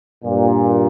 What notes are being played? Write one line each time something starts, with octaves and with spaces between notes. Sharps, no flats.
G2 A#2